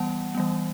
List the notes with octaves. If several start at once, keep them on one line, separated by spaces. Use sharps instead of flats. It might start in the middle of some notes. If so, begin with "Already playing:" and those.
Already playing: E3 G3 B3 F#5 A5
E3 G3 B3